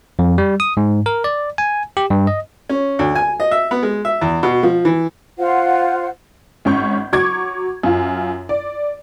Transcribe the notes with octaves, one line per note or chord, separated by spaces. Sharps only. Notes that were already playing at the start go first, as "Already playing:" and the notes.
F2
G3
D#6
G#2
A#4
D5
G#5
G4
G2
D#5
C#4
D2
G#5
D#5
E5
B3
G#3
E5
E2
B2
F3
E3
F4 C5 F#5
G#1 C#4 C#6 G6
F#3 C#6 D6 G#6
F#2 F4
D5